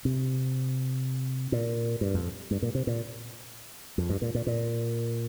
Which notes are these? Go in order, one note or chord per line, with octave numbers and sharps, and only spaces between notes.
C3
A#2
G2
F2
G2
A#2
C3
A#2
F2
G2
A#2
A#2
A#2